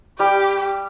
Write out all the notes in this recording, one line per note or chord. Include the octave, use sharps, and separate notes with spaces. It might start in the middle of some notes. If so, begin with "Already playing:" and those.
G3 G4